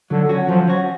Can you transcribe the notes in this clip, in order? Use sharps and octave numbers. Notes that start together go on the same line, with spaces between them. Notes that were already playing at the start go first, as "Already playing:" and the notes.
D3 F#3
C#4 F#4
F3 F#3
C#4 F#4